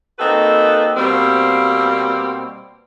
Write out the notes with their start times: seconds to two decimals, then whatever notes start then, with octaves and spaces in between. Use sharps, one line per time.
0.19 A#3 C4 D#4 F#4 A4 B4
0.96 B2 G3 A#3 C4